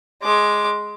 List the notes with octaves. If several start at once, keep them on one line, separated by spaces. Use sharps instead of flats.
G#3 D6